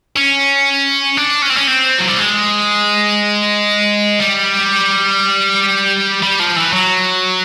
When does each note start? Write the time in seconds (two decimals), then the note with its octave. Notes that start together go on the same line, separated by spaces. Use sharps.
0.16 C#4
1.17 D4
1.42 C#4
1.50 C4
1.58 C#4
1.68 C4
1.99 F#3
2.08 G3
2.19 G#3
4.21 G3
6.23 G3
6.39 F3
6.56 E3
6.73 F#3